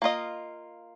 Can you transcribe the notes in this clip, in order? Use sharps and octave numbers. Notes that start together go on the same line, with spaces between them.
A#3 F4 D#5